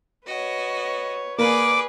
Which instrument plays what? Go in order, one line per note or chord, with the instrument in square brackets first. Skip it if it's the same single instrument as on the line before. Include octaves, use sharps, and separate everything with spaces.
[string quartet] F#4 D#5 [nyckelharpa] B4 C#5
[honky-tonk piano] A#3 [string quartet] G#4 B4 [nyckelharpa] D5 [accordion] D6